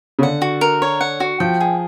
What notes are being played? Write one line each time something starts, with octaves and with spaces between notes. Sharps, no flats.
C#3
D3 F#5
F#4
A#4
C#5
F#5
F#4
F3 G5
G#4